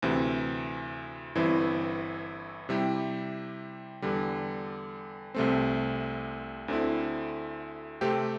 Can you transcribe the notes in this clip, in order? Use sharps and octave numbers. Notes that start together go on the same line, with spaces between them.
D2 C3 E3 C4
G1 G2 E3 C4 E4
C3 G3 E4 G4
E2 D3 G3
C2 C3 A3 C4
D2 D3 C4 E4
C3 A3 C4 G4